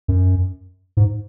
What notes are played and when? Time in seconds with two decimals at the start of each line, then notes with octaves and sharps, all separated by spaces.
0.08 F#2
0.97 G#2